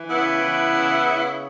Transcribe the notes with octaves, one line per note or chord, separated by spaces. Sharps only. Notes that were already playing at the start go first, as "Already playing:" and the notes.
Already playing: E3
C#3 B3 E4
E3
C#3
C#3